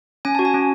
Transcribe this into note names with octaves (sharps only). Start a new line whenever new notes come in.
C#4 G#5
F#4 A5
G#5
C#4